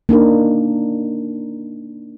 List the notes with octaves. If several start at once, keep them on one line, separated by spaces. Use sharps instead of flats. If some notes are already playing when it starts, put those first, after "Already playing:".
A#3 D4 D#4 A#4